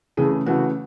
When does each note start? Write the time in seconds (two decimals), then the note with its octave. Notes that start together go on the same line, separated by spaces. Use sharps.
0.17 C#3 E3 A3 G#4
0.46 C#3 E3 A3 F#4